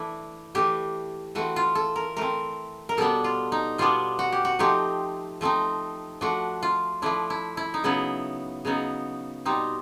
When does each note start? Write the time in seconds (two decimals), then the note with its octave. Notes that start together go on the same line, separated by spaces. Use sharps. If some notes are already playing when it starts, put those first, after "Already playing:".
Already playing: E3 A3 D4 E4
0.55 E3 A3 D4 G4
1.35 E3 A3 C4 F#4
1.56 F4
1.75 A4
1.96 A#4
2.17 E3 A3 C4 A#4
2.89 A#4
2.97 B2 G3 B3 D4 A4
3.24 F4
3.52 D#4
3.78 B2 G3 B3 D4 F4
4.19 F#4
4.32 G4
4.45 F#4
4.59 F3 A3 C4 D#4 G4
5.41 F3 A3 C4 D#4
6.21 F3 A3 D4 F#4
6.63 F4
7.02 F3 A3 D4 E4
7.30 E4
7.57 E4
7.74 D#4
7.84 C#3 F#3 B3 D#4 E4
8.65 C#3 F#3 B3 D#4
9.45 B2 G3 C4 D#4